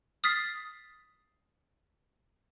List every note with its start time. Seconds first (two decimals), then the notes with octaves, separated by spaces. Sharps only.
0.24 D#6 F6 A6 B6 C7